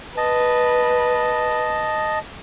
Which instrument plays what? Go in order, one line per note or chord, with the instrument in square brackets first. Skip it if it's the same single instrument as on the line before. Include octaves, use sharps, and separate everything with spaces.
[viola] B4 [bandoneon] D#5 A5